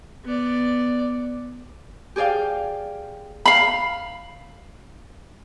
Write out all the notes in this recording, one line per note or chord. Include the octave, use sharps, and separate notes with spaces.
B3 D5
G4 G#4 D5 F5 G5
F5 B5